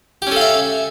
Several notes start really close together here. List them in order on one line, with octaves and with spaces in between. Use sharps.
G4 C#4 A4 F5 E5